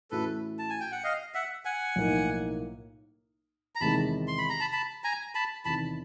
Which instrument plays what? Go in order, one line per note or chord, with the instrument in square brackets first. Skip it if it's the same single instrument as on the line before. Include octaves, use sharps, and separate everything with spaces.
[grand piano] A2 E3 A3 C#4 F#4 [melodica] A4 B4
[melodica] A5
G#5
G5
F#5
D#5 F5
E5 F#5
F#5 G#5
[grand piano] B1 A2 F3 A#3 D#4
[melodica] A#5
[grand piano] E2 C3 D#3 G#3 [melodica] A5 B5
[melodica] C6
B5
A#5
A5 B5
A5 B5
G#5 A#5
A5 B5
[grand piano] E2 C3 D#3 [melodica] A5 B5